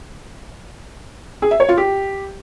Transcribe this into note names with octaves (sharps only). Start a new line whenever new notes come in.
G#4
E5
C#5
F4
G4